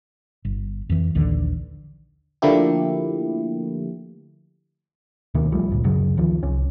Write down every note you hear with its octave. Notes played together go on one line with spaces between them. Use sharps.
G1
F2 E3
A#1 D#2 D3 E3
D3 F3 A3 A#3 E4 G4
D2 B2 D#3 A#3
B1 F3 G3 A3
G1 D2 A#2
D1 F#2 C#3 F#3
D2 D#3 F3
C2 C#4